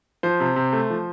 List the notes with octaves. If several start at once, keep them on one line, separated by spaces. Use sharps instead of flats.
F3 C5
C3
C3
A3
F3